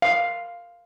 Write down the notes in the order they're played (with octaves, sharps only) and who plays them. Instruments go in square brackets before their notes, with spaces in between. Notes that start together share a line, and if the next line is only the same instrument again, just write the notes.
[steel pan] F5